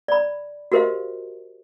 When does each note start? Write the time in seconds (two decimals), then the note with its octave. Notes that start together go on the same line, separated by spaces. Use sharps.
0.08 D5 B5
0.72 F#4 G4 A#4 C5 D#5 F5